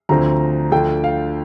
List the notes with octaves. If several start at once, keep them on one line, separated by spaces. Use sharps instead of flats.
D2 D3 F3 C4 A#5
D2 D3 F3 G5
F5